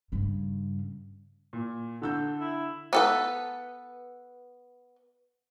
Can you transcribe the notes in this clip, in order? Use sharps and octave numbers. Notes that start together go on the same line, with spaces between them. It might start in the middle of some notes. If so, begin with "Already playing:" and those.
G2 C#3
A#2
D3 A4 E6 G6
E4
B3 A4 B4